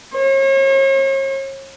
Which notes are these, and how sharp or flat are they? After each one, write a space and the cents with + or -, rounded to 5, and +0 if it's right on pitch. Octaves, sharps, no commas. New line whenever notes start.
C#5 -40